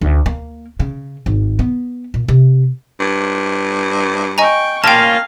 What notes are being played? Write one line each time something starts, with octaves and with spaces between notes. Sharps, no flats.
D2
A#3
C#3
G#1
B3
A#2
C3
G2
D#5 G5 G#5 A#5 C#6
A#3 C#4 F4 F5 G5 A5